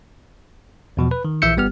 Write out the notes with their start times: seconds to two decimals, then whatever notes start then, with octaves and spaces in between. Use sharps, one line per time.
0.97 E2 B2 F3
1.11 B4
1.25 D#3
1.42 A#1 E3 E5 E6 G6 C#7
1.57 G1 G3 B3 G4 F6